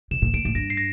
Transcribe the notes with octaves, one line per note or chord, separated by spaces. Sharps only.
C3 E7
A#2
A2 D7
A2
G2 A#6
C7
A#6